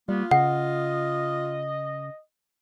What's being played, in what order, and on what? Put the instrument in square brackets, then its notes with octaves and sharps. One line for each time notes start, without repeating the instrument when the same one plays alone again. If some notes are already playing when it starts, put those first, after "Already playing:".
[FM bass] G3 [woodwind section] A#3 B3 [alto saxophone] F4
[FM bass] C#3 [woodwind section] D#5 [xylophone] F#5